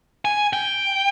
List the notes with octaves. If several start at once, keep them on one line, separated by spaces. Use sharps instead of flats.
G#5
G5